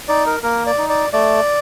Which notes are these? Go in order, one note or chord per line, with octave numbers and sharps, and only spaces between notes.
D#4 D5
A#4
A#3 A#4
D5
D#4
D5
A3 D5